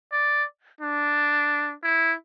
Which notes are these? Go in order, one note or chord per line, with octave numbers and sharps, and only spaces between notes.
D5
D4
E4